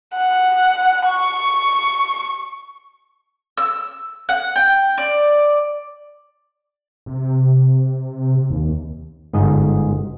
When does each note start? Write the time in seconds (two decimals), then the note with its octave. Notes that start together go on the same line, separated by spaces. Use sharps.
0.15 F#5
1.07 C#6
3.58 E6
4.29 F#5
4.56 G5
4.98 D5
7.06 C3
8.50 D#2
9.33 G1 G#2 D#5